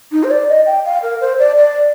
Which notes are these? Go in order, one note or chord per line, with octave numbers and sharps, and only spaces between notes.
D#4
C5
D5
D#5
G5
F5
A#4
C5
D5
D5